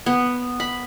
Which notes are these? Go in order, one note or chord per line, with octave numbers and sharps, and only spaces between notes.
B3
B5